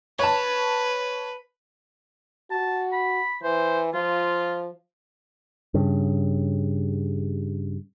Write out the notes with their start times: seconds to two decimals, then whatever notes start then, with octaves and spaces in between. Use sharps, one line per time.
0.19 B4 C#5 A5
2.51 F#4 A5
2.92 B5
3.43 E3 C5
3.94 F3 F4
5.74 G2 C#3